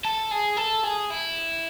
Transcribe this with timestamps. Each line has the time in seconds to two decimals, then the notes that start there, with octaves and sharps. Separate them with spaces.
0.05 A4
0.31 G#4
0.57 A4
0.84 G#4
1.10 E4